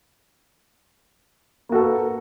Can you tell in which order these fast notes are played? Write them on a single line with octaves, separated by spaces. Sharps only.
A#3 F#4 A4 B4